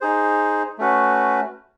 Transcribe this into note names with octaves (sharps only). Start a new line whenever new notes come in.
D#4 G#4 C5
A3 C#4 F#4 B4